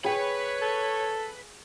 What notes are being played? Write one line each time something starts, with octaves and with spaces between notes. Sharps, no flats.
G#4 B4 C#5 G5 B5
A4